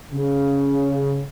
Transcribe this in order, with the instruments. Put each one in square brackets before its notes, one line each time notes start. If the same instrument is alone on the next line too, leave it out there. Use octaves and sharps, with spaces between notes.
[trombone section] C#3